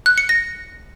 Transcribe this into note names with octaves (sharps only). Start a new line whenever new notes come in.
F#6
C#7
A#6